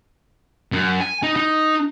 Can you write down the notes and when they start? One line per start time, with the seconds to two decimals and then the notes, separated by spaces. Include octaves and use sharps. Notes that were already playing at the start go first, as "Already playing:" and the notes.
0.72 F#2
1.00 G#5
1.23 D#4
1.36 D#4